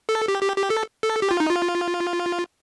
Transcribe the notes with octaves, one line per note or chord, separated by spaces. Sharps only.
A4
G4
G4
G4
A4
A4
G4
F4
D#4
F4